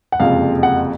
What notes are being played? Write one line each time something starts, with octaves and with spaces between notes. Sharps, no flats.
F#5
F#1 F2 C3 F3 G#3 F5
F#5